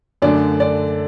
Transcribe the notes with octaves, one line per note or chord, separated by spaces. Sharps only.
F#2 D3 A3 D4 D5
D4 D5